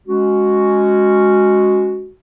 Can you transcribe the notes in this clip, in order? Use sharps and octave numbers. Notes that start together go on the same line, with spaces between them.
G#3 C#4 F#4